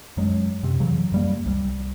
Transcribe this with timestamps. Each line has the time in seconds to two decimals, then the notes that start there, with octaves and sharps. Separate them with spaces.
0.17 F#2 F#3 G#3
0.63 F#2 C3
0.80 C#3 E3 F#3
1.12 F#2 G3 A#3
1.46 C2 G3